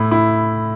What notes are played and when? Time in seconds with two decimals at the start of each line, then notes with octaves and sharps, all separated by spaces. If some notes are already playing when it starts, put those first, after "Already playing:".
Already playing: A2 E4
0.11 E4